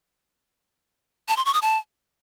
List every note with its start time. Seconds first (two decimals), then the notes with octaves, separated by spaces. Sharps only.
1.28 A5
1.37 C6
1.45 C#6
1.54 D#6
1.62 A5